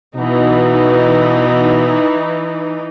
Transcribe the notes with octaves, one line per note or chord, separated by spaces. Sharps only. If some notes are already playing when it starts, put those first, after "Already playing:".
B2 E3 D#4